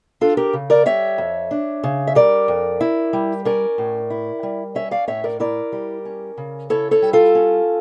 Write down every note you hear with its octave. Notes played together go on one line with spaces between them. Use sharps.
D4 F4 A4
G4 A#4
C#3
A#4 D5
G3 C#5 E5
F2
D4
C#3
E5
G3 A#4 D5
F2
E4
G3
C#4 A#4 D5
A2
E4
G3
C#4 C#5 E5
D5 F5
A2 C#5 E5
A#4 D5
E4 A#4 D5
G3
C#4
C#3
E4 A4 C#5
A4 C#5
G3
F4 A4
C#4